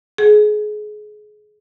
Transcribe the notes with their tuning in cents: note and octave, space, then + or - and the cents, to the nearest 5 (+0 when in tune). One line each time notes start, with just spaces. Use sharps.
G#4 +25